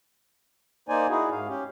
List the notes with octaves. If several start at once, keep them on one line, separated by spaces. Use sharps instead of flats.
A#3 D#4 C5 D5 G#5
D#4 E4 F#4 G#4
G#2 F5
C#4 G4